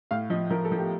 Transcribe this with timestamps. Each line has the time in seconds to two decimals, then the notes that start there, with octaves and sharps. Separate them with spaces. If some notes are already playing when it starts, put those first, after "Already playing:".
0.11 A2 F5
0.30 F3 D#5
0.50 F3 A#4
0.65 A4
0.72 F3
0.77 G4